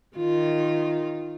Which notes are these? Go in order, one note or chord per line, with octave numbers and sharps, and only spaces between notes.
D#3 F4